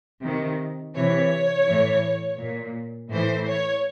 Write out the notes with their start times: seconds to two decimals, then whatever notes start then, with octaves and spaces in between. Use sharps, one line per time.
0.23 C3 D#3
0.95 C3 E3 C#5
1.67 A2 E3
2.39 A#2
3.12 A2 E3 C5
3.48 C#5